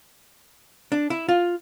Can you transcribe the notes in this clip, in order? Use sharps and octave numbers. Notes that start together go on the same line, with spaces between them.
D4
E4
F4